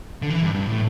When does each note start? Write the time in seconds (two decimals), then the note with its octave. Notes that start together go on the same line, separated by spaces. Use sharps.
0.22 D3
0.30 E3
0.43 G2
0.55 G2
0.68 A2